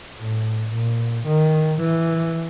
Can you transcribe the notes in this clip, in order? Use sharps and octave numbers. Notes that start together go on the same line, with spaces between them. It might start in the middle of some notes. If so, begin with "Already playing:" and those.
A2
A#2
D#3
E3